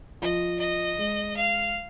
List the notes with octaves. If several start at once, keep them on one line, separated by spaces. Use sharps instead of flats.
F3 D#5
D#5
G#3
F5